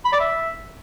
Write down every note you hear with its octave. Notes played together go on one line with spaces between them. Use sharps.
B5
D5
E5